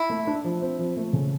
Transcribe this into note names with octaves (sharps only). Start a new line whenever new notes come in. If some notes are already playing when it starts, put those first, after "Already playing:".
Already playing: E4
A3
D4
F3
C4
F3
A3
C#3